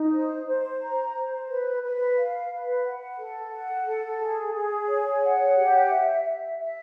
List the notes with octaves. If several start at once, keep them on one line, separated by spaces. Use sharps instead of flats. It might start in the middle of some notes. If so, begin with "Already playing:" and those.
Already playing: D#4
C5
C5
A#5
C5
B4
B4
F5
B4
F#5
A4
F#5
A4
G#4
G#4
C#5
F#5
G4
E5
E5
E5